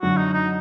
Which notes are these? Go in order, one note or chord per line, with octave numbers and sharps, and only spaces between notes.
F#2 D3 F#3 F#4
D#4
D#4